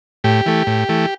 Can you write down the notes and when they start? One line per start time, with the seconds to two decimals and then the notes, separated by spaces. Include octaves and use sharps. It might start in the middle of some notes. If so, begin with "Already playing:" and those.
0.24 A2 G4
0.46 E3 A3
0.67 A2
0.89 E3 A3